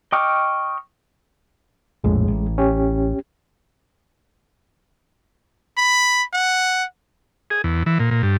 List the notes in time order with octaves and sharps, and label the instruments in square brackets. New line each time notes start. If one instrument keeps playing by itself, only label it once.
[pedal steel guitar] D#5 G5 C#6 D6 F6
[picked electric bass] A#1 F2 A2 [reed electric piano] G#3
[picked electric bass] A1
[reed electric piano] C#4 G4
[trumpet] B5
F#5
[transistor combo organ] G#4
E2
E3
A#2
A#2
G2